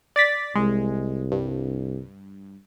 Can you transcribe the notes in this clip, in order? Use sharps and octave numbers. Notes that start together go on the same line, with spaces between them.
D5 A6 B6
C2 G#3
G2